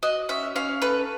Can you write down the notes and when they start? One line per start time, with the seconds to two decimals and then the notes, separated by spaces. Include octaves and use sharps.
0.03 F#4 D#5
0.29 C#4 E5
0.56 C#4 F5
0.82 A4 B4